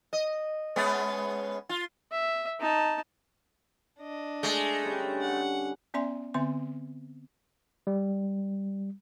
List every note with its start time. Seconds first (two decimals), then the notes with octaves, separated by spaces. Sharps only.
0.13 D#5
0.76 G#3 B3 C#4
1.69 F4
2.12 E5
2.60 D#4 A5
4.00 D4 D#5
4.43 G#3 A3 G#4
4.83 D3 G3 C#4
5.21 F#5
5.94 B3 C#4 D5 E5 G#5 C6
6.34 D3 B3 C4 E5 C6
7.87 G3